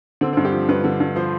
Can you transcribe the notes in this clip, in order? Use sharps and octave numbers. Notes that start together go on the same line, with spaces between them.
D3 C4
C4
G2
G4
F3
G2 B4
D3
G2
F3 C5